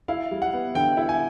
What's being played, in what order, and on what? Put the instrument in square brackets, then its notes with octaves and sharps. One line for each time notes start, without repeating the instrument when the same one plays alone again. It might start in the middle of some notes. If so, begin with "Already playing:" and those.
[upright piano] E4 [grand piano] F5
[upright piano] G3
[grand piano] F#5
[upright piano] B3
[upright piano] D3 [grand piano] G5
[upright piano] E4
[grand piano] G#5